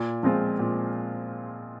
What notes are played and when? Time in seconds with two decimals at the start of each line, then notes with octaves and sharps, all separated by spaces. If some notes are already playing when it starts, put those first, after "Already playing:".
Already playing: A#2
0.23 F3 G#3 C4 F4
0.59 A#2